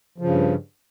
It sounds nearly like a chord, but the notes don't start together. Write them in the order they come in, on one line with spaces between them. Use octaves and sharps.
F3 C#3 G2